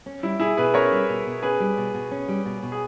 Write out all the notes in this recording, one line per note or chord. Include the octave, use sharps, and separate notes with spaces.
C#4
G3 E4
B2 E4 G#4
B2 G#4 B4
C#4 A#4 C#5
G3
B2
B2
C#4 G#4 B4
G3
B2
B2
C#4
G3
B2
B2
G#4